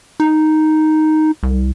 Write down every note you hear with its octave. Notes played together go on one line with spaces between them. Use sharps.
D#4
C2